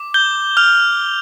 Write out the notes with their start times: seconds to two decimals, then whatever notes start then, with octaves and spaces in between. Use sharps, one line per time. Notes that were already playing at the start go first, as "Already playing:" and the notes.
Already playing: D6
0.14 G6 G7
0.57 F6 F7